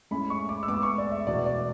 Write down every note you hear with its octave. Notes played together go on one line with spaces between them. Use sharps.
A2 G#3 C#4 E4 B5
C#6
D6
E6
A2 G#3 B3 D6
C#6
D5
E5
E1 E2 B2 D5
D5